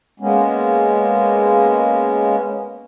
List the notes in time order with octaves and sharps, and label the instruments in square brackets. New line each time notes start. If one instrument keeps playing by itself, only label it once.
[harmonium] G#3 A#3 B3 C#4